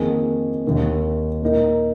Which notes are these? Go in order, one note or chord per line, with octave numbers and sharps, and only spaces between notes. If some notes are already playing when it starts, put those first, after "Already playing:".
Already playing: F2 D#3 A#3 G#4
D#2 D#3 A#3
A#2 A#3 D#4 A#4